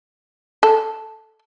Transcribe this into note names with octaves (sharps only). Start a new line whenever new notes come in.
A4